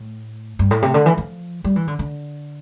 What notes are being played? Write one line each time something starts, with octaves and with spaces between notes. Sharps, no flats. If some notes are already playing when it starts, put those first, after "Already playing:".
Already playing: A2
G2
A2
C3
D3
E3
F3
G3
E3
D3
D3